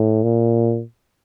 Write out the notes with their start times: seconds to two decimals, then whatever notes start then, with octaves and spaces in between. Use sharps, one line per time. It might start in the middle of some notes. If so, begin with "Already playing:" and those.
Already playing: A2
0.23 A#2